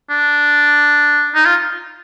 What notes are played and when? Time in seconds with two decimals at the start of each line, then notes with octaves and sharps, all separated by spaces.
0.10 D4
1.35 D#4
1.45 F4